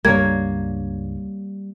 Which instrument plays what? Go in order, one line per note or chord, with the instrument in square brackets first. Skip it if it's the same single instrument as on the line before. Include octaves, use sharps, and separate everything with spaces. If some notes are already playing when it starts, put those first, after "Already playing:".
[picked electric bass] C#2 G2 D4 [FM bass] G3 [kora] A#3 C#5 [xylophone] G#6